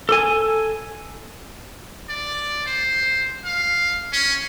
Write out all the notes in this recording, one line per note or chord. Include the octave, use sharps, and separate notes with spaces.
A4 G#5
D5
C5
F5
C#4